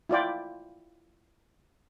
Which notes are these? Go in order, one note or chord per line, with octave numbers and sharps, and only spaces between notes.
E4 F4 D5 G5